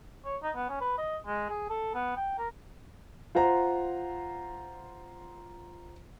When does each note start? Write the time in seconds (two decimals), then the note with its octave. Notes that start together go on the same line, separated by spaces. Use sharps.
0.25 C#5
0.42 D#4
0.55 B3
0.69 C#4
0.81 B4
0.98 D#5
1.26 G#3
1.49 G#4
1.69 A4
1.94 B3
2.16 G5
2.38 A#4
3.35 F4 C5 F#5 A#5